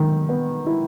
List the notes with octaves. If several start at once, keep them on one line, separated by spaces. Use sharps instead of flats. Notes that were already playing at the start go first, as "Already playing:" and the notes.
Already playing: D#3
B3
E4